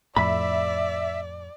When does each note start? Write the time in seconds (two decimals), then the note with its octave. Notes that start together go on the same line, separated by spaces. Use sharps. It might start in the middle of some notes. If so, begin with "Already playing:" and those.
0.16 F2 A2 D5 E5 B5